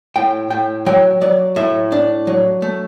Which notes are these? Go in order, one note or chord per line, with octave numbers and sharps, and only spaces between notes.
A2 G5
A2 G5
F#3 G5
F#3 D5
A2 E5
D4
F#3
A3